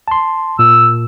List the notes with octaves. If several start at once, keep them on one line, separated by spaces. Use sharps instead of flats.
A5 C6
A#2 E6